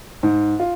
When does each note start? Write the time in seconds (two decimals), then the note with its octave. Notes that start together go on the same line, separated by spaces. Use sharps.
0.23 G#2
0.60 F4